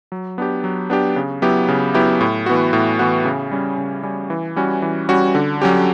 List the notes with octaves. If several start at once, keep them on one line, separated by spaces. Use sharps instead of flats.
F#3
B3 D4 G4
F#3
B3 D4 G4
C#3
F#3 B3 E4 G4
C#3
F#3 B3 E4 G4
A2
E3 B3 F#4
A2
E3 B3 F#4
C#3
G3 C#4
C#3
G3 C#4
E3
G3 C#4 F#4
E3
G3 C#4 F#4
D3
F#3 C#4 G4